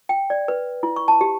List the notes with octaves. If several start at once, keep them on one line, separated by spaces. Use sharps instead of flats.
G5
D5
B4
E4
C#6
A5
G4